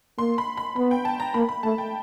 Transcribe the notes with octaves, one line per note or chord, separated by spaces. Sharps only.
A#3 C6
B5
B5
B3 B5
G5
A5
A#5
A#3 B5
B5
A3 A5
G5